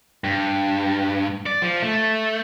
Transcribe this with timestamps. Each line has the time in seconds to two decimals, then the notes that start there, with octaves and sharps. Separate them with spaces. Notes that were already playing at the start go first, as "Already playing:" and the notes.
0.24 G2
1.46 D5
1.62 F3
1.82 A3